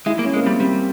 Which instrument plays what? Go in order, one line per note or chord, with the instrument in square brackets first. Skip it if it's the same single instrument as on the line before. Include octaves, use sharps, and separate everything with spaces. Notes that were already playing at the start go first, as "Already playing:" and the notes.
[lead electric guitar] G#3 [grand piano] E4
[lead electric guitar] A#3
[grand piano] C#4
[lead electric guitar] G#3
[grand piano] A#3
[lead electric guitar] G3 [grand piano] C4
[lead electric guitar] G3 [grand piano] C4